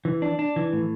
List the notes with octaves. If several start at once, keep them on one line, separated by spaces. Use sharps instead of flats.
E3
D4
D4
E3
A2